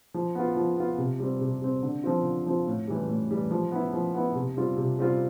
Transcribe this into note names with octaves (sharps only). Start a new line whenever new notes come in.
F3
B3 F4
F3
B3 F4
C3
G3 C4
C3
G3 C4
D3
F3 C4 F4
D3
F3 C4 F4
A2
E3 G3
A2
E3 G3
F3
B3 E4
F3
B3 E4
C3
G3 C4 F4
C3
G3 C4 F4